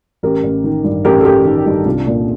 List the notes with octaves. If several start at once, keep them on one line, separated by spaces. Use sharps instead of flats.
A1 G4 A#4
A1
D#3
G2
A1 G4 A#4
A4
A1 G4 A#4
D#3
G2 D#4 G4
C2 D4 F4
A#2